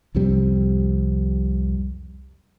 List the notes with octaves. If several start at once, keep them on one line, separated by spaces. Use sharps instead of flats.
C2 F2 C3 G3